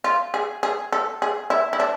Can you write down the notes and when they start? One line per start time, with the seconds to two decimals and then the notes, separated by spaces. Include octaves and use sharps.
0.04 F4
0.34 G#4
0.63 G#4
0.93 A4
1.22 G#4
1.50 E4
1.73 E4
1.80 D4